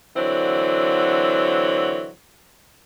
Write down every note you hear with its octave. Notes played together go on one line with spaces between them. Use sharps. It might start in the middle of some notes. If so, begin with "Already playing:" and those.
D3 E3 F#3 C4